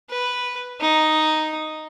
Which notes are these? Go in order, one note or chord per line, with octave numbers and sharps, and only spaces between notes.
B4
D#4